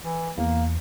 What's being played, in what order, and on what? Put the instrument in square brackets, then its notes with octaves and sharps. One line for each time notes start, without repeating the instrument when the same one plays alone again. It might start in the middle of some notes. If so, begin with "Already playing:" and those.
[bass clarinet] E3
[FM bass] E2 [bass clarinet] A#3